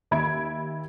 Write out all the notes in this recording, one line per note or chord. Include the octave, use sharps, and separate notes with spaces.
D#2 E5 B5 G#6 D7